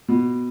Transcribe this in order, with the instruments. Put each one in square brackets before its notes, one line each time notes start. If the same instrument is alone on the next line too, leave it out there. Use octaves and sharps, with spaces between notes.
[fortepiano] B2